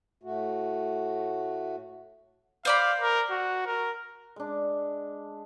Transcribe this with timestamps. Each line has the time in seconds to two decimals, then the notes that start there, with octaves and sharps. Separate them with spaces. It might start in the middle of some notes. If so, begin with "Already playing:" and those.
0.23 A2 A3 F#4
2.65 C5 D5 F5 B5
3.01 A#4
3.31 F#4
3.66 A#4
4.36 G#3 D4